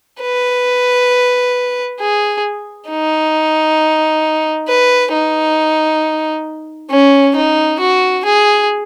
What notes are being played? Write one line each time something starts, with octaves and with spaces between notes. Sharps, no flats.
B4
G#4
D#4
B4
D#4
C#4
D#4
F#4
G#4